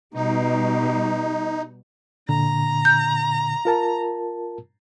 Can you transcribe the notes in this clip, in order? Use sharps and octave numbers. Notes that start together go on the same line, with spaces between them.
B2 G3 D#4
A#2 D3 A#5
G6
F4 A#4 A5